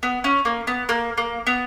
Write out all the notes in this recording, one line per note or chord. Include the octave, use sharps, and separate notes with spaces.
B3
C#4
A#3
B3
A#3
A#3
B3